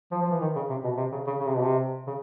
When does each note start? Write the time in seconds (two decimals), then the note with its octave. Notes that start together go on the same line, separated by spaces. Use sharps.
0.12 F3
0.22 F3
0.31 E3
0.41 D#3
0.55 C#3
0.69 C3
0.84 B2
0.97 C3
1.12 C#3
1.26 C#3
1.40 C#3
1.47 C3
1.55 B2
1.62 C3
2.07 C#3